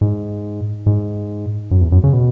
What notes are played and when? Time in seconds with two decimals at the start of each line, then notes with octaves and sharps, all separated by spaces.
0.01 G#2
0.86 G#2
1.71 F#2
1.81 E2
1.92 F#2
2.04 C#3
2.13 B2